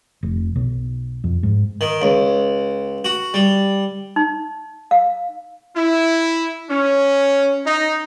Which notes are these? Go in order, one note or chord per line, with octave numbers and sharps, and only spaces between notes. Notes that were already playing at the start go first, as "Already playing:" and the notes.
F1
B1
F2
G#2
D#3
C#2
F#4
G3
D#4
F5
E4
C#4
D#4